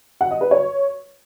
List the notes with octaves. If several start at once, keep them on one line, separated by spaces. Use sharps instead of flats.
F#5
D#5
B4
C#5